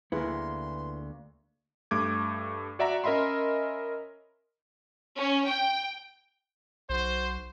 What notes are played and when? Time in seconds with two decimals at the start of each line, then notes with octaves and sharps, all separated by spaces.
0.12 D2 A#3 B3 E4 G#4 B4 C6
1.91 G2 A3 D6 G#6
2.79 F#4 D5 E5 F#5 A#5
3.04 C#4 A#4 D#5 E5 B5 C6
5.17 C#4
5.47 G5
6.90 B1 F#4 C5